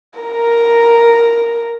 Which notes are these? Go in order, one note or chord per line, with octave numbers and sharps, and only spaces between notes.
A#4 A#5